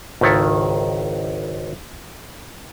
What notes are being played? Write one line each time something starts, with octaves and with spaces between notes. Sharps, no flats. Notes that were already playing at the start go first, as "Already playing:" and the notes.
G#1 C#2 D#3 E4 A4